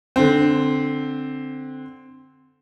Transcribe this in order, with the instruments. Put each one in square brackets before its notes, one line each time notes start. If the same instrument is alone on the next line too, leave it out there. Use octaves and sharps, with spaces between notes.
[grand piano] D3 C4